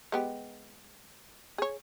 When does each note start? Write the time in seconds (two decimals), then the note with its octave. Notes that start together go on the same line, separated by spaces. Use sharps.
0.12 G#3 B3 G4
1.58 G#4 C#5